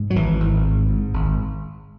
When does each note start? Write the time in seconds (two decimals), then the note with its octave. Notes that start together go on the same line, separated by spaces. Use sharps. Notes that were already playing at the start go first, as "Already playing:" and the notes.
Already playing: G#2
0.10 F#3
0.15 G#1 E3
0.40 G#1
0.64 G#2
0.89 G#2
1.14 G#1